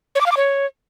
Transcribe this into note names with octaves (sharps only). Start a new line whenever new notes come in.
C#5
D6
F5
D6
C#5